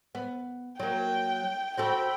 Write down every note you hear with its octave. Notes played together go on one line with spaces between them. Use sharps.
B3
F#3 A#3 G5
C4 F#4 A4 G5 B5